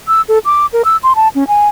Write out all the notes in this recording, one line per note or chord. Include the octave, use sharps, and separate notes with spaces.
E6
A4
D6
A#4
E6
C6
A5
C#4
G#5